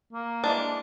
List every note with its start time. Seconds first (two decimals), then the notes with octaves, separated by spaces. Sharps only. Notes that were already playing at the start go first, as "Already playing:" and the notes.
0.13 A#3
0.44 E3 G#3 D4